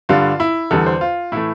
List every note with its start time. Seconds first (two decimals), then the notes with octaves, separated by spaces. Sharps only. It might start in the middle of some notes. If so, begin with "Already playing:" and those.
0.09 G2 D3 G3 F4
0.40 E4
0.71 E2 D3 G3 A4
0.86 C5
1.01 F4
1.32 A2 E3 A3 E4